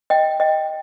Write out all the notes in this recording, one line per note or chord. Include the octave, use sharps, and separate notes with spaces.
D#5 G5
D#5 G5